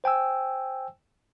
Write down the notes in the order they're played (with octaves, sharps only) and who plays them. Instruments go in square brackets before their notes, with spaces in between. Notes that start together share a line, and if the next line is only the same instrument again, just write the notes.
[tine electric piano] C5 G5 G#5 E6